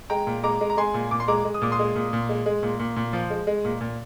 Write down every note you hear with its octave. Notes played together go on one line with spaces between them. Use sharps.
G#3 G5 A#5
A#2
G#3 A#5 D6
G#3
A#5
G#3 G#5 C6
A#2
A#2 D6
C6
G#3 A#5 D6
G#3
D#6
A#2 D6
C6 D#6
G#3
A#2
A#2
G#3
G#3
A#2
A#2
A#2
F3
G#3
G#3
A#2
A#2